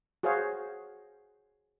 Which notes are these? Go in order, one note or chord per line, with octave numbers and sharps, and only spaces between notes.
F#4 G#4 C5 C#5 F5